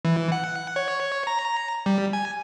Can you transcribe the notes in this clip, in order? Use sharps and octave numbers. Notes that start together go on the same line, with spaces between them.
E3
F#5
C#5
A#5
A#5
G3
G#5